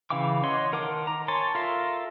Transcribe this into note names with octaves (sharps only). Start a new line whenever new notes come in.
C#3 E3 F5 G5 D6
C#5 D#5 F#5 C6
D#3 A#4 F#5 A5 D6
A#5
C#5 G#5 A5 C6
F4 A4 A#4 E5 C6